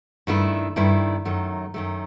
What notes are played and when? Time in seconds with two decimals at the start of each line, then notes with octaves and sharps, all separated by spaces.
0.27 G2 D#3 A3 E4
0.76 G2 D#3 A3 E4
1.25 F#2 D#3 A3
1.74 F#2 D#3 A3